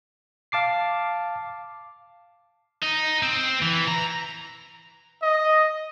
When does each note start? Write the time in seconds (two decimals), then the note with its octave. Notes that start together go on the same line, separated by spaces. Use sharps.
0.52 F5 A5 D6 C7
2.83 D#4
3.23 C4
3.62 E3
3.88 A#5
5.22 D#5